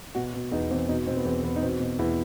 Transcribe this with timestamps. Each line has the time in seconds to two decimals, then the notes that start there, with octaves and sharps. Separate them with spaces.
0.15 B2 F#4
0.34 B2
0.51 E2 D#4
0.70 E2 C4
0.88 B2 D#4
1.07 B2 C4
1.17 B3
1.25 E2 C4
1.44 E2 B3
1.56 D#4
1.62 B2 C4
1.80 B2
1.99 E2 E4